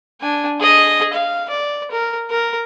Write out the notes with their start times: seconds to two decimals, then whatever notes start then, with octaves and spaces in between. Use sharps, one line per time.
0.21 D4 G#5
0.59 G#4 D#5
1.13 F5
1.50 D5
1.91 A#4
2.30 A#4